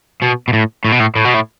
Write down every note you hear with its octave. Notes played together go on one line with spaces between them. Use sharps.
B2
B2
A2
A2
B2
A2
A2
B2
A2